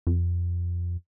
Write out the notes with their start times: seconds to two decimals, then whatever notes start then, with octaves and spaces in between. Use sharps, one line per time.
0.07 F2